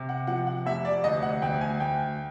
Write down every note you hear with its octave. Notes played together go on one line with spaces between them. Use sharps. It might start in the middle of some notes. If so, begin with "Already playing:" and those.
Already playing: C3
F#5
F3 F#5
F#5
F1 E5
D5
D2 D#5
F#5
D2 G5
G#5
D2 G5